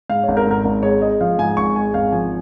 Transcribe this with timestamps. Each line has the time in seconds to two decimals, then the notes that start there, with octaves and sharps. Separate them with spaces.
0.09 G#2 F5
0.23 G#1 C#5
0.37 A#4
0.47 G#2 A#4
0.65 G#1 A#4
0.83 G#3 C#5
1.01 G#3 D#5
1.21 F3 F5
1.39 G#2 G#5
1.57 G#1 C#6
1.76 G#3 G#5
1.94 G#1 F5
2.12 F3 G#5